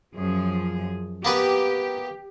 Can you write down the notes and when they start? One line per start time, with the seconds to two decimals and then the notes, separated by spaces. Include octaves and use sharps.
0.15 F#2 F3 G#4
1.25 A#3 B3 G4 B4